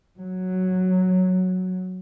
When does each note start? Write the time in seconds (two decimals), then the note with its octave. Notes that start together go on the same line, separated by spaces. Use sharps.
0.18 F#3